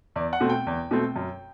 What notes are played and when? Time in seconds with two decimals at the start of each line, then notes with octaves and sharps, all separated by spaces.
0.16 E2 D5
0.33 F#5
0.40 B2 A3 C4
0.50 G5
0.67 E2
0.91 B2 A3 C4
1.16 F#2